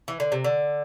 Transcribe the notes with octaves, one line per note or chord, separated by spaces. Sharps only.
E3
D3
C3
D3